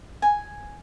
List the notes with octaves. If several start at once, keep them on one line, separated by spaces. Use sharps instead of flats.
G#5